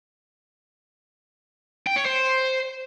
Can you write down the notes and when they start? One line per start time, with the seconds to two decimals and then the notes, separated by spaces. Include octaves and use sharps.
1.87 G5
1.96 C#5
2.06 C5